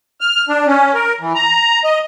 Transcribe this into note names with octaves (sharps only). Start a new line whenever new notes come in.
F6
D4
C#4
A#4
E3
A#5
D#5